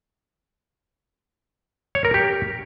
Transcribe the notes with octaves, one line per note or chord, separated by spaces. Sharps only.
C#5
A#4
G4